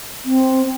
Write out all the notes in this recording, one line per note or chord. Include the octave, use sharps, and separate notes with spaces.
C4